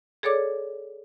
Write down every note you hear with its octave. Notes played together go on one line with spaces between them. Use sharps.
G#4 A4 C#5 D5 D6